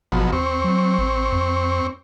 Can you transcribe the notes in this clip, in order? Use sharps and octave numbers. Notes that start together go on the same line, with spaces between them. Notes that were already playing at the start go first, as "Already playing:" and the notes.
G#1 B2 F3 F#3
D#2 C4 C#6
F#3
A1
F2